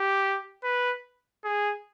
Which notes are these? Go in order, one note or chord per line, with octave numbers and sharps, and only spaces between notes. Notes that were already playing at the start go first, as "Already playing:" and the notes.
Already playing: G4
B4
G#4